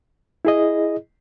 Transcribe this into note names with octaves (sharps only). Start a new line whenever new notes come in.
E4 G#4 D#5